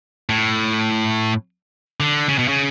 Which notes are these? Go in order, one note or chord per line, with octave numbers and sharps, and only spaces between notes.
A2
D3
C#3
B2
C#3